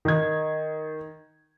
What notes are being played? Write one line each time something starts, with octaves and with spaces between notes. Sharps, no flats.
D#3 G#6